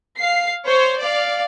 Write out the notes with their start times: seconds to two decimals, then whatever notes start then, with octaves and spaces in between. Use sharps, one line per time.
0.17 F5 C7
0.65 C5 C#5
0.98 D5 F5